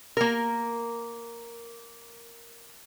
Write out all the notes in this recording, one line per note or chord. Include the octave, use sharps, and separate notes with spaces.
A#3 A#4